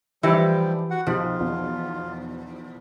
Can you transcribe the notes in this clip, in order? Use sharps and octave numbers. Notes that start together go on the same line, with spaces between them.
E3 F3 G3 D#4 E4 G4
F#4 F#5
B1 F3 F4 G4 F#6
B1 E2 B2